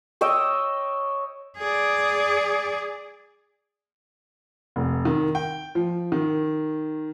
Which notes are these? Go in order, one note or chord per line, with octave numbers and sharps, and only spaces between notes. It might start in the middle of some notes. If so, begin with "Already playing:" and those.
C#5 D#5 G5 E6
G#4 D5
F1
D#3
G5
F3
D#3